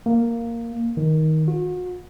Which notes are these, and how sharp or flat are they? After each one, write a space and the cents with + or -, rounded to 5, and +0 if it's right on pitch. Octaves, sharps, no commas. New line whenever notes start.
A#3 -5
D#3 +15
F#4 -40